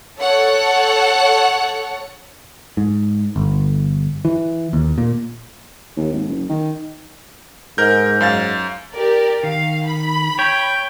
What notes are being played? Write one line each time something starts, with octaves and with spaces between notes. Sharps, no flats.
A4 C#5 F#5
G#2
G1
E3
D#2
A#2
D#2
G#1
F#1
D#3
G#2 A#4 G6
F#2 F5 A6
G4 A#4 D5
D#3 F5
B5
C#5 G5